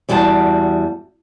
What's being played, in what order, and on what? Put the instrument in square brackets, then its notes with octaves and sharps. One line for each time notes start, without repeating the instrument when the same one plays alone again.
[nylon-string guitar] E2 G3 F#4 G5 A5